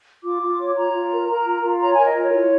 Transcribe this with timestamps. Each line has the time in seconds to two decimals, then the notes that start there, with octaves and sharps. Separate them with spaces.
0.24 F4 D6
0.41 F4
0.59 C#5
0.76 F4 A#5
0.94 F4
1.11 A#4
1.28 A#4
1.46 F4
1.63 F4
1.81 C#5 A#5
1.93 A#4 G#5
2.06 D#5
2.15 F4
2.20 C#5
2.33 E4